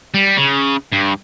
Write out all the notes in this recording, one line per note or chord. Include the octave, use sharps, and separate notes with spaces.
G3
C#3
G2